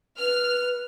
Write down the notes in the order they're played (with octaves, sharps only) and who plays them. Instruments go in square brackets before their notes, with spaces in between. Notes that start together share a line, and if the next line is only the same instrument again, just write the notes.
[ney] B4 [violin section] F6